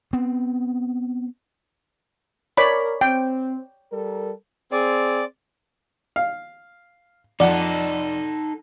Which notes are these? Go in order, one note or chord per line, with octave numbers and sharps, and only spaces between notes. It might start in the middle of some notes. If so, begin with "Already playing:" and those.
B3 C4
A#4 C#5 D5 B5
C4 G5
G3 A4 A#4
C4 G#4 D5
F5
F2 D#4 A4 D5 F#5